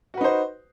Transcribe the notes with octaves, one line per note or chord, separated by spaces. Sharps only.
D#4 F#4 B4 C5